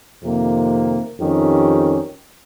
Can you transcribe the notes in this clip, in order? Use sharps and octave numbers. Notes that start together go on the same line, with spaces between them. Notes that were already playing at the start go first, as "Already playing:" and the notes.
F2 C3 D#3 A#3
F2 D#3 G3 C#4 G4